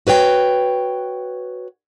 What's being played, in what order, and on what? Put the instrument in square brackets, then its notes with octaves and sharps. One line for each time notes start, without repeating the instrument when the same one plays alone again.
[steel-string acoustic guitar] F#4 B4 C#5 G5